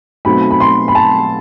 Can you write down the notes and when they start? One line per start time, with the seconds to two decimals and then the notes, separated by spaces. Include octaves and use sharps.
0.25 B1 B2 A3 C4 B5
0.51 B5
0.60 C6
0.88 B5
0.95 A5